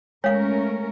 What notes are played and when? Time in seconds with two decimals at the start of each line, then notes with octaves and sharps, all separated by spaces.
0.24 G#3 A3 C#4 A#4 C#5 F5